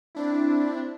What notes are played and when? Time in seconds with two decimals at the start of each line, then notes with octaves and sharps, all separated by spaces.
0.15 C4 D4 E4